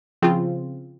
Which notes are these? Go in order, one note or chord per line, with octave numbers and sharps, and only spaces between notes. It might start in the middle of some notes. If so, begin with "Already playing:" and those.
C#3 F3 C4 F4